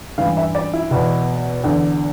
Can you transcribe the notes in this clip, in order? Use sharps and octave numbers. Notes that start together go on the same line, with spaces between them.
G2 E3 F5
E5
D5
E4
E2 B2
E2 D3